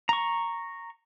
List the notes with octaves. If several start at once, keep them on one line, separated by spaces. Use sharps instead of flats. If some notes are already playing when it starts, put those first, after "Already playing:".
A#5 C#6